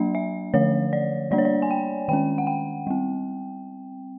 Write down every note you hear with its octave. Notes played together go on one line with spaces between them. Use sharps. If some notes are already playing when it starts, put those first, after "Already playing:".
Already playing: F#3 A#3 D4 E5
E5
D3 F3 A3 C#5
D5
G3 A#3 D4 D5
C#5
D5
G#5
G5
D#3 G#3 C#4 G5
F#5
G5
G3 C4